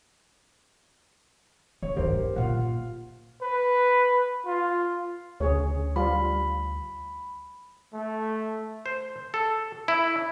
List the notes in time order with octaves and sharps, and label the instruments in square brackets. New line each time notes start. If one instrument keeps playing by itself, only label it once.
[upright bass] C#3 C#4 [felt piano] C#5
[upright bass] G2 D#3 [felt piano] G4 A#4 C5
[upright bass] G2
[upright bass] A#2 A#3 [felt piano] F4 F5 F#5
[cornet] B4
F4
[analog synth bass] D2 [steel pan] C#3 G#4 C#5
[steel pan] G3 F4 [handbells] B5
[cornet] A3
[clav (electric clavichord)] C5
A4
E4